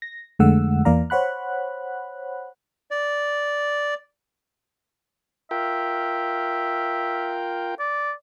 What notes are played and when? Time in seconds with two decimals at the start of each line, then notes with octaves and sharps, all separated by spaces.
0.02 A#6
0.39 F2 D3 G#3 A3 F#5 E6
0.85 E2 E3 A#3 D5 F5 A#5
1.10 C5 C#5 F#5 B5 F#6
2.91 D5
5.51 F4 A#4 E5 G5
7.79 D5